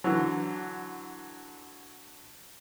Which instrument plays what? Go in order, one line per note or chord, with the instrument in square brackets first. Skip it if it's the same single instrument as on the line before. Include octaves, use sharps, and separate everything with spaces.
[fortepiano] D3 E3 F#3